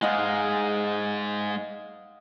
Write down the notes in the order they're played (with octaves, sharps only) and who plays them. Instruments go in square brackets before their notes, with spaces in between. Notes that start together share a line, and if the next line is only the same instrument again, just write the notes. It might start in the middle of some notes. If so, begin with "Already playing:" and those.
[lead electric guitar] G#2 G#3 [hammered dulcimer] D#5 F5 F#5